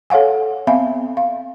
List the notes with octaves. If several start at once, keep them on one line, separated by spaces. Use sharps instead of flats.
A4 C#5 F5 F#5 G#5
B3 C4 E5 F5 G#5 B5
F5